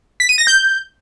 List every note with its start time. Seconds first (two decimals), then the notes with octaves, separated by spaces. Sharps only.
0.20 B6
0.29 D#7
0.38 A#6
0.47 G6